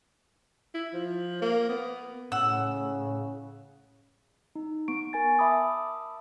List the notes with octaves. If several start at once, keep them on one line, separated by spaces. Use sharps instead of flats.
E4
F3
A#3
B3
A2 C#3 F#5 E6
D#4
B3 C#6 D7
A#4 G#5 A6
E5 A5 B5 D6 D#6